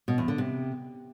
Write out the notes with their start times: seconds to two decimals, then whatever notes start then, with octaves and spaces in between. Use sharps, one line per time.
0.08 B2
0.18 E2
0.28 D3
0.38 C3